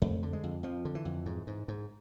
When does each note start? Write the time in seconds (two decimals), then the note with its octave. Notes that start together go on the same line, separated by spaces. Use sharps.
0.02 F2 A3
0.23 D3
0.33 G#3
0.44 F2
0.63 F2 F3
0.85 D3
0.95 E3
1.05 F2
1.26 G#2
1.47 G#2
1.68 G#2